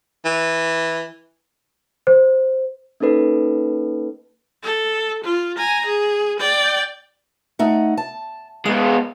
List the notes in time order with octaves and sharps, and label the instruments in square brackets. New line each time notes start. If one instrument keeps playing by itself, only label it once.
[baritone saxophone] E3
[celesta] C5
[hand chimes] A#3 C#4 D#4 A4 B4
[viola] A4
F4
G#5 A#5
G#4
D5 G5
[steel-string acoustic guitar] A3 D#4 F#5
A5
[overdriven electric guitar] G#3 B3 [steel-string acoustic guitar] F5